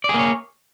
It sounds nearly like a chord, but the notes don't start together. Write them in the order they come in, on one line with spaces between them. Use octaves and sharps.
D5 G#4 A#3 C#5